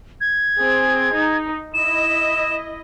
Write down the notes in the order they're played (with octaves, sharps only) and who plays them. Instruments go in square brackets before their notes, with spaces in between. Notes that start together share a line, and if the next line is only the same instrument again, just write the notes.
[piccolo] G#6
[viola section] C4 G#4
D#4
[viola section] E4 D#5 [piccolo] E7